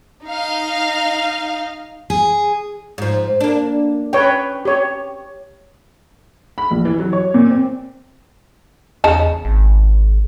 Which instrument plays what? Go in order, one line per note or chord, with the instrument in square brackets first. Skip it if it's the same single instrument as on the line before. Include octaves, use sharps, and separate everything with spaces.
[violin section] D#4 F5
[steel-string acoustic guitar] G#4
[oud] G#2 F3
A#3 D4
[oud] C#4 [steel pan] B4 C#5 G5
[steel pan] G4 C#5
[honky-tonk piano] B5
A#1
E3
F#3
C#5
A#2
C4
[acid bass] E2 [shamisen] C#3 D#4 A5
[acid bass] G#1